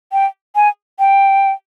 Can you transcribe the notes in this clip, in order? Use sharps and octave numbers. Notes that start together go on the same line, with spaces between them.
G5
G#5
G5